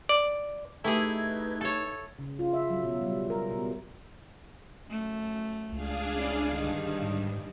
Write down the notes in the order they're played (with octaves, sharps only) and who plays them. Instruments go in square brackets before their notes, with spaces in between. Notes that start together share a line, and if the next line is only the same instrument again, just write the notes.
[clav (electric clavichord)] D5
[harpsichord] A3 G4 [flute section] D#4 B4 G#6 [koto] E4 G#4
[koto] A4 C#5
[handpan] C#3
F4
E5
F#3
B2
G3
A#4
B2
[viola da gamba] F#2 A3
[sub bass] C#2 [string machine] D4 G#4 F5
[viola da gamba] C#4 E4 D5
[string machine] G2 [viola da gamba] D3 D#3
[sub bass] G#2